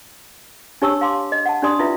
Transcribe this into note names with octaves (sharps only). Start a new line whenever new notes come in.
D4 G4 C#5 A5 C#6 E6
F5 A5 C6 D6
D#5
F#5 A5
D4 G4 D5 C6 D#6
E4 F4 B4 E5